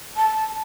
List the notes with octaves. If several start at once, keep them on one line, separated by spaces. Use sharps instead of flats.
A5